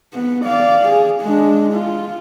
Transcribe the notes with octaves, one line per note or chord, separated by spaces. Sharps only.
B3
D5 F5
G#4
G#3 D4
F4